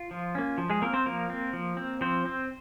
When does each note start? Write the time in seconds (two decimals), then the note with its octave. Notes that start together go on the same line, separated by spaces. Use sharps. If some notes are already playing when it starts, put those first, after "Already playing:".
Already playing: F4
0.11 F3
0.35 A#3 C#4
0.58 F3
0.70 G#3 G#4
0.82 A#3 C4 A#4
0.93 C4 C5
1.06 F3 A#3 A#4
1.30 C4
1.53 F3
1.77 C4
2.01 F3 C4 C5
2.25 C4